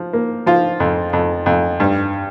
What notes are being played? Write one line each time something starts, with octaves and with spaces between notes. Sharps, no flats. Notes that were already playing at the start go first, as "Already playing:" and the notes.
Already playing: F3
A#3
F3 F4
F2
F2
F2
G2